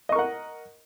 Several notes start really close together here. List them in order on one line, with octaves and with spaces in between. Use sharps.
D#5 C#6 A#4 F#5